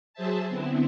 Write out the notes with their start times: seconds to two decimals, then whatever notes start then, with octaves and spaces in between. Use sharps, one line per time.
0.14 F#3 G#4 C5 E5 A5
0.48 D3 B3 C4 E4